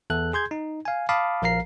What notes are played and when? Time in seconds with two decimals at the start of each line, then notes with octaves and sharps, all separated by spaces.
0.10 E2 A4 F#6
0.33 G#4 C6 G6 G#6
0.51 D#4
0.85 F5 G#5
1.09 F5 A5 B5 D6 D#6
1.42 A#1 F3 A#4 F5 A#5 C7